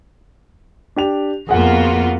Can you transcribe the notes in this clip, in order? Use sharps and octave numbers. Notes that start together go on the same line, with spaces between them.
D4 G4 F7
F2 A#3 B3 F4 F#4 G#4 F#5